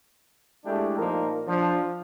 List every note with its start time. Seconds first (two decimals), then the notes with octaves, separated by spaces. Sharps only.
0.66 G#3 A3 D4 E4 G4
0.98 A#2 F3 A#3 D#4 A#4
1.46 F3 D4